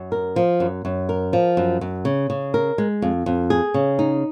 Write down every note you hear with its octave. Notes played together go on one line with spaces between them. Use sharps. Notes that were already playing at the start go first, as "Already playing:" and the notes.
Already playing: F#2
A#4
F3
F#2
F#2
A#4
F3
F#2
F#2
C#3
C#3
A#4
G#3
F2
F2
G#4
C#3
D#4